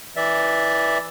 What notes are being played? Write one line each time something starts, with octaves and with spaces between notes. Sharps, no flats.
E3 D5 E5